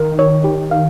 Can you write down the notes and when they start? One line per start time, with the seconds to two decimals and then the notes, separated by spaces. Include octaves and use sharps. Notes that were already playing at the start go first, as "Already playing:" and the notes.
Already playing: D#3 A#4
0.19 C#5
0.44 G4
0.71 F5